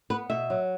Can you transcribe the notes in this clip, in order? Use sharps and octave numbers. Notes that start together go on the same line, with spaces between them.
B3 B4
B2 E5
F#3